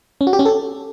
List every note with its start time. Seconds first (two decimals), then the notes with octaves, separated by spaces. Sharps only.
0.21 C#4
0.27 F#4
0.33 G4
0.39 C#4
0.45 A4